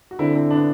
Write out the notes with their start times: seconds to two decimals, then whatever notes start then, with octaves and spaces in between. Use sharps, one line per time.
0.11 F#4
0.19 D3 C4 E4
0.35 C4 E4
0.51 B3 D4